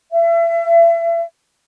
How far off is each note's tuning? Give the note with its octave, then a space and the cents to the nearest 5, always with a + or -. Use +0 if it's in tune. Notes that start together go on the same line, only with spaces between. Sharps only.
E5 +35